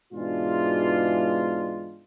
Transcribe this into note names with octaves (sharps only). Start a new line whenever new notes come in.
G#2 B2 E3 G#3 D4 F4